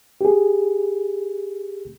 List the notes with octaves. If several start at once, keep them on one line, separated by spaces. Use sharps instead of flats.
G4 G#4